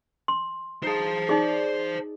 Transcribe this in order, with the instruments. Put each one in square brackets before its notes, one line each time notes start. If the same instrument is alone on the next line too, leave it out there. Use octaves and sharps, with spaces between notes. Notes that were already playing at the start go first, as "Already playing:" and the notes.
[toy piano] C6
[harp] D#4 G#4 [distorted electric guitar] C5 A5
[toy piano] D#4 G#4 [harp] D5